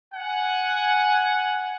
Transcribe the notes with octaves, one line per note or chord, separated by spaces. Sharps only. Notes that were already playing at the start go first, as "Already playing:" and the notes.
F#5 G#5